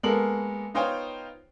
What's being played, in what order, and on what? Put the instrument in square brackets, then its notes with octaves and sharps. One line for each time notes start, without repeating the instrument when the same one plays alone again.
[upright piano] G#3 A#3 B3 A4 A#4 F#7
B3 D#4 F4 C5 C#5 G5